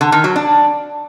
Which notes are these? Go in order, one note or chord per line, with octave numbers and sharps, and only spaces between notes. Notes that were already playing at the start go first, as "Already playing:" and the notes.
D3
D#3
F#3
D4